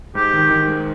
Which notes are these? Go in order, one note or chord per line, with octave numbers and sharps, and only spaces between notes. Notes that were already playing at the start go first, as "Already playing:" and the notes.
G#2 G4
D#3
D#3
G#3